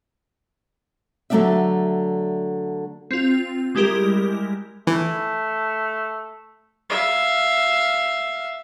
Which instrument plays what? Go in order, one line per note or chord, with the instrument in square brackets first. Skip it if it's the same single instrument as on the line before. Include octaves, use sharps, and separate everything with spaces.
[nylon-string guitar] D3 F#3 A3 D4 D5 E5
[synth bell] C4 F4
G3 G#3 E4 G4 A#4
[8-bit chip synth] E3 [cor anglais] A3
[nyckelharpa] E5 F5